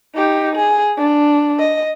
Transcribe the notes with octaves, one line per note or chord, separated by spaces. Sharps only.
D#4 G4
G#4
D4
D#5